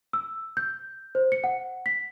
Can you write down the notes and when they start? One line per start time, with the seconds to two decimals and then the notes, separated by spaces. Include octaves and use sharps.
0.13 E6
0.57 G6
1.15 C5
1.32 C#7
1.44 F#5
1.86 B6